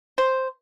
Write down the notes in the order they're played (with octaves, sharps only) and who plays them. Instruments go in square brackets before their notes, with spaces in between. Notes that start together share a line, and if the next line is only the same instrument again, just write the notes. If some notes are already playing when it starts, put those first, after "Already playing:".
[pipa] C5